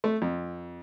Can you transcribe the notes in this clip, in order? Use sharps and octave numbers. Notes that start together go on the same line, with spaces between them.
A3
F2